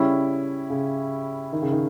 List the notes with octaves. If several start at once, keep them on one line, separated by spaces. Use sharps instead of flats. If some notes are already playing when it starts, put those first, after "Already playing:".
Already playing: C#3 G3 C#4 E4
C#3
D#3
C#3
D#3